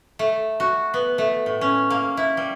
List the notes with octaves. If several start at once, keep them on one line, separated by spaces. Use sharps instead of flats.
A3
F#4
B3
A3
A2
C#4
A#3
E4
G3